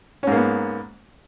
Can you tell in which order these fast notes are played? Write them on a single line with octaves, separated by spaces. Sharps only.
C#4 G#2 A#3 B3